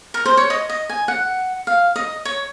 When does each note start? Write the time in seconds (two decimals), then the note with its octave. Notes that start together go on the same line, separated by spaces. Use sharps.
0.14 A#4
0.26 C5
0.37 C#5
0.50 D#5
0.70 D#5
0.89 G#5
1.08 F#5
1.67 F5
1.96 D#5
2.25 C#5